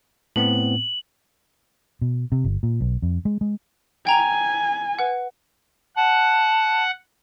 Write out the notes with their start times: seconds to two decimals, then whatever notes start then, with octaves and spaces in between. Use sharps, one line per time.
0.36 A2 B3 C4 F#7
2.01 B2
2.32 C3
2.44 G1
2.63 A#2
2.81 B1
3.02 F2
3.25 G#3
3.41 G#3
4.07 G5 G#5 A#5 F7
4.99 B4 F#5
5.96 F#5 A5